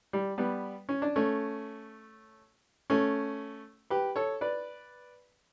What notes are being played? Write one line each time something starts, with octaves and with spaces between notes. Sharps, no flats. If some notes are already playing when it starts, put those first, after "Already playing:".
G3
G3 B3
C#4
D4
A3 C#4
A3 C#4
G4 B4
A4 C#5
B4 D5